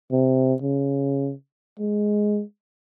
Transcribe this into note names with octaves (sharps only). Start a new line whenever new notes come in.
C3
C#3
G#3